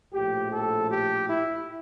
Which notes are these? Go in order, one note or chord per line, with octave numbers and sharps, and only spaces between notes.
A#1 A2 F3 G4
A4
G4
E4